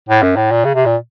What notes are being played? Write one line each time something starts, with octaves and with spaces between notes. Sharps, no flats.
A2
F#2
A2
A#2
C#3
C3
A#2